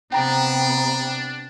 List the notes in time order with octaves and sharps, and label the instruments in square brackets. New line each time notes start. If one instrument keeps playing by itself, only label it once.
[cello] C3 B3 [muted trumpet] D4 [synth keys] G5 A#5